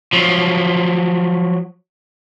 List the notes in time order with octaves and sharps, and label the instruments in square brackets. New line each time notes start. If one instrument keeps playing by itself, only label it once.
[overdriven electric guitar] F3 F#3